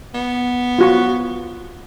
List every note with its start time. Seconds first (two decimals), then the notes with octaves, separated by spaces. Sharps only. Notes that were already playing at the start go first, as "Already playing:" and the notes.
0.14 B3
0.79 F4 F#4 C#6